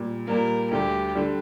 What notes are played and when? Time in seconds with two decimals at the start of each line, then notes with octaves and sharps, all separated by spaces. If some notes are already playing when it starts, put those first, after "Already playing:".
Already playing: A#2 G3
0.27 A#2 G3 A#3 A#4
0.71 D2 D3 G3 G4
1.15 D3 G3